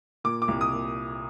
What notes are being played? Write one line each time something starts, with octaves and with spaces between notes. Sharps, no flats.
A#2 D6
D6
C2
D#6
A#2